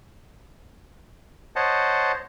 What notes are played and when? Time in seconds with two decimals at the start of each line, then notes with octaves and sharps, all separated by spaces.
1.56 C5 C#5 D#5 F#5 A5